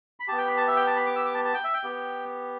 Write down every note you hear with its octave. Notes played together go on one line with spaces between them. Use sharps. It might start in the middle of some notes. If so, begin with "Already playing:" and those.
B5
B3 G4 A5
G5
B5
A5
E5
G5
A5
B5
D6
E6
D6
A5
A5
G5
E5
G5
B3 G4